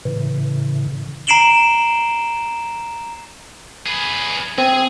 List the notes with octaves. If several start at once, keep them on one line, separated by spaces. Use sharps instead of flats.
A2 C#3 E3
A#5 C7 D7 E7 F#7 G7
G#4 B4
C4 G#4 G#5